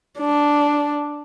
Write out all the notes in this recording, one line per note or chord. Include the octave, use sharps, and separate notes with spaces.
D4